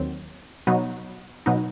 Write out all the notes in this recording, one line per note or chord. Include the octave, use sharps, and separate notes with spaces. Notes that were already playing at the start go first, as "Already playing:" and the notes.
Already playing: D#2 D#3 F#3 C4
B2 F#3 B3 D#4
B2 F#3 B3 D#4